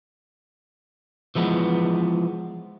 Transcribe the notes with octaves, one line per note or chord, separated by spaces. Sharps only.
E3 F3 G#3 B3